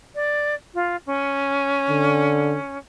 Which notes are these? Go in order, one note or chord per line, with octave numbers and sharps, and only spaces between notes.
D5
F4
C#4
D3